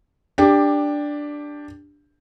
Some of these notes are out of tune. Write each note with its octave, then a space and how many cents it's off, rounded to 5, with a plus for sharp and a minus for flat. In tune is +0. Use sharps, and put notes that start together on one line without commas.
D4 +0 G4 +15